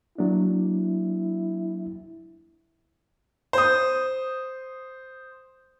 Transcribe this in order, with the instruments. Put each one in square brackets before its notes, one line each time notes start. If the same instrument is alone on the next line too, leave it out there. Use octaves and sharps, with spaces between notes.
[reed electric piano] F#3 A#3 D4 [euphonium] E4
[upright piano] C5 D#6